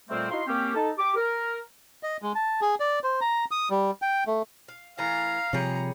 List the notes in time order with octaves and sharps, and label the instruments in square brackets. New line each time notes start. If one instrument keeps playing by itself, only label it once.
[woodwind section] F2 A#2 G3 A3 A#3 C4
D#4 E4 F#4 F5 A#5 C6
A#3 C4 C#4 G4
D#4 A4 A5
G4 D6
A#4
[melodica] D#5
G#3
A5
G#4
D5
C5
A#5
D#6
G3
G5
A3
[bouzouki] F5
[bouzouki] E3 A3 [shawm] F5 [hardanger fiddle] A#5
[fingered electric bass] C3 F3 [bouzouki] G3 G#4 C#5 [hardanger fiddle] A#5